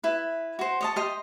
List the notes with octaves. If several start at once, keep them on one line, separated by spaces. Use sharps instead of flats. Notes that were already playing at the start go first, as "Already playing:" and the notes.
E4 B4
F#4 C5
C#5 D#5 A5
G4 D#5 C6